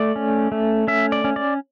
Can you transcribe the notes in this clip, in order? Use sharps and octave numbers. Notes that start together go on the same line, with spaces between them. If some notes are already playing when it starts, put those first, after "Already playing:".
Already playing: A3 D5
C#4
A3
C#4 E5
D5
C#4
D5